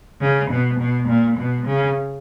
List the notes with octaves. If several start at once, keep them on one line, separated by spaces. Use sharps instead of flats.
C#3
B2
B2
A#2
B2
C#3